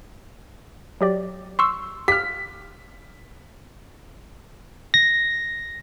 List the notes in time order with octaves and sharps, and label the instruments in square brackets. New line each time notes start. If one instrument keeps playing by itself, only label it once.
[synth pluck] F#3 G4 D5
[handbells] C6 C#6 E6
[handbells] G4 [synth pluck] F5 F6 [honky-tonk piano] B6
[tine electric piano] A#6